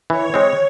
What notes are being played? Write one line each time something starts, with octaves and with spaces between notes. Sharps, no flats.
E3 C#5
G#3 C4